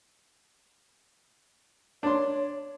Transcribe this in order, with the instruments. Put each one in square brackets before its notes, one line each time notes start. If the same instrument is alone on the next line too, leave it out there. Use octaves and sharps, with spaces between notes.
[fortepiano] D4 C6 [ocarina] C#5